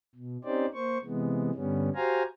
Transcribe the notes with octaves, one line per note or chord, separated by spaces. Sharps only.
B2
C4 C#4 D#4 G4 C5 D5
A#3 C5 C#6
C3 E3 G#3 B3
G2 D3 G3 B3 C#4
F#4 G4 C5 F5 G#5 A#5